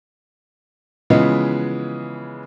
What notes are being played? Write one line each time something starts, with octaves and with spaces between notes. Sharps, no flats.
C#3 E3 F3 G#3 B3